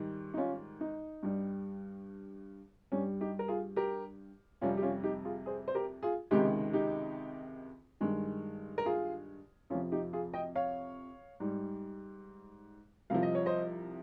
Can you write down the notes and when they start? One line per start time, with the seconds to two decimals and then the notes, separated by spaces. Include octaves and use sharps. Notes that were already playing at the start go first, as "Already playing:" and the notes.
Already playing: G#2 D#3 G3
0.34 D#4
0.37 C#4 F4
0.81 D#4
1.23 G2 G3
2.92 G2 G3 C#4
3.21 D#4 G4
3.39 A#4
3.48 F4 G#4
3.76 G4 A#4
4.61 F2 C3 G3 C#4 F4
4.77 G4
4.82 C#4 F4
5.03 D#4 G4
5.25 F4 G#4
5.46 G#4 C5
5.68 C5
5.75 G4 A#4
6.03 F4 G#4
6.31 C#2 C3 D#3 G#3 D#4 G4
6.73 D#4 G4
8.01 G2 D#3 G#3
8.78 A#4
8.86 F4 G#4
9.70 F2 C3 F3 C#4 F4
9.92 D#4 G4
10.13 F4 G#4
10.34 D#5 G5
10.55 C#5 F5
11.40 G#2 G3
13.10 C2 C3 F3 F5
13.23 D#5
13.35 C#5
13.46 C5 D#5